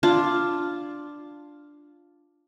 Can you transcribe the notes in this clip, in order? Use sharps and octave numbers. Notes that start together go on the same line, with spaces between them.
D4 F4